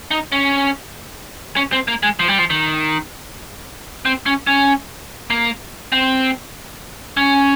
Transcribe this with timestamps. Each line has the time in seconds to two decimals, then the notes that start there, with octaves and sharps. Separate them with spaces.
0.11 D#4
0.32 C#4
1.56 C#4
1.72 C4
1.88 A#3
2.03 G#3
2.19 F3
2.28 G3
2.38 F3
2.50 D#3
4.05 C4
4.26 C#4
4.47 C#4
5.30 A#3
5.92 C4
7.17 C#4